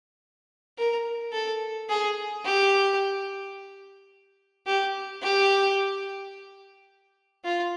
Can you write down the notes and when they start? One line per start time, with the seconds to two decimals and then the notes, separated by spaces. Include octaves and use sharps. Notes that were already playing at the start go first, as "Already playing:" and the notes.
0.78 A#4
1.33 A4
1.89 G#4
2.45 G4
4.67 G4
5.22 G4
7.44 F4